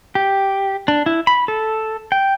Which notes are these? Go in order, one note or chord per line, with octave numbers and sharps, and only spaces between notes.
G4
D4
E4
B5
A4
G5